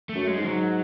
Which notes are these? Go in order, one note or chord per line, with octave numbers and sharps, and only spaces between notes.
A3
F#2
G#3
G#2
F#3